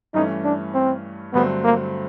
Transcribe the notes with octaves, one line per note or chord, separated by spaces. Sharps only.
G2 E3 A3 C#4 D#4
D4
C4
G2 D3 F#3 A3 B3 C4
A#3